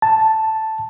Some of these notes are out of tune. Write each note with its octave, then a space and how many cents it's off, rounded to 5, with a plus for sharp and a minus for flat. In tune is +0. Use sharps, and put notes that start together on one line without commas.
A5 +0